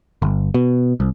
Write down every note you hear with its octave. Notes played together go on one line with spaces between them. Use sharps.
G1
B2
C2